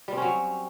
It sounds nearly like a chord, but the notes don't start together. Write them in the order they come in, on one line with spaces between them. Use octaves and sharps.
G3 C4 C#4 F#3